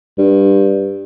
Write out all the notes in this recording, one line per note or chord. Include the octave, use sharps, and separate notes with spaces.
G2